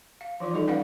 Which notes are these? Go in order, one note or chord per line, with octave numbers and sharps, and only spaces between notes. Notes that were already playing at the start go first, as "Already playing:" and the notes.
F5
E3 F3 F4 D5
G3 D#4 F#4 A4 D5
C#4 B4 D5 F5 F#5 B5